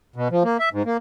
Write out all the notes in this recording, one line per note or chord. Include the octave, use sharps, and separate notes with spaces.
B2
F3
A#3
E5
G#2
A#3